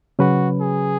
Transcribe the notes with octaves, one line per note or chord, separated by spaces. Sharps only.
C#3 F#3 C#4 F#4 B4
G#4